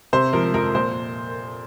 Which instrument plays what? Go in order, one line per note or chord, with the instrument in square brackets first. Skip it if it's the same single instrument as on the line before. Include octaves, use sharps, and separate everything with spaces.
[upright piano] C3 C5
F3 A#4
F2 A#4
A#2 C5